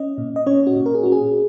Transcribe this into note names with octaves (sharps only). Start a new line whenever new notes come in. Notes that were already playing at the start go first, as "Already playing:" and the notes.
Already playing: C#4 D#5
A#2
D#5
C#4 C#5
F#4
A#2
A#4
G#4
C#4 F#4
G#4